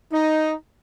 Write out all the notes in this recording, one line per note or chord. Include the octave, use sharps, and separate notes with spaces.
D#4